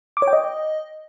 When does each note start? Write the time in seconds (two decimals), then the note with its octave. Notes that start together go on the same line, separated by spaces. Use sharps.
0.17 D6
0.22 C#5
0.28 G5
0.33 D#5